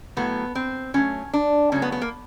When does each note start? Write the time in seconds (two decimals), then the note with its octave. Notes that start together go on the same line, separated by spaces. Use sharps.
0.16 A2 F#3 A3 B3
0.55 C4
0.94 B2 F#3 A3 C#4
1.33 D4
1.72 C#3 F#3 A3 C#4
1.82 B3
1.92 B3
2.02 A#3